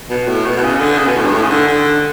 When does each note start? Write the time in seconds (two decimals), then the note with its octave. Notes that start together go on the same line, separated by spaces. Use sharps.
0.10 B2
0.27 A2
0.46 B2
0.57 B2
0.63 C#3
0.81 D3
0.98 C#3
1.06 B2
1.16 A2
1.24 G2
1.33 A2
1.42 C#3
1.50 D3
1.68 D3